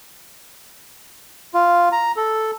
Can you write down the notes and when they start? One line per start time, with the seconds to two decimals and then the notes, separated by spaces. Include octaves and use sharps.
1.54 F4
1.92 A#5
2.17 A4